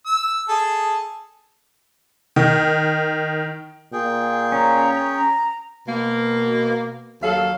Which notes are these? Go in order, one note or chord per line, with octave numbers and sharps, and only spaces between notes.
E6
G#4 A4
D#3
A#2 G#4 G5
C#4 A#5
A#5
B2 A#3
D#2 F#3 A4 F5